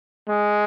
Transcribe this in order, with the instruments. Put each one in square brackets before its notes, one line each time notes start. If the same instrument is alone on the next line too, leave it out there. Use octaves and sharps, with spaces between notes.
[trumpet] G#3